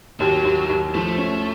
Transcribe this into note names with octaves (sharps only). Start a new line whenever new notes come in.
D#2 F#3
D#2
D#2
F3 A3
C#4